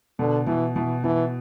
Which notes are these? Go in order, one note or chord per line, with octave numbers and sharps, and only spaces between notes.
B2 D3
B2 E3
B2 E3
B2 E3